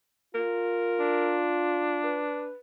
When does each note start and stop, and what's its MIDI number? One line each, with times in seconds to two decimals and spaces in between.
0.35 2.27 65
0.35 1.39 70
1.00 2.51 62
2.04 2.58 71